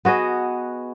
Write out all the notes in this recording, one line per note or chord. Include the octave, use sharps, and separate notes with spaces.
B3 F#4 G#4 D#5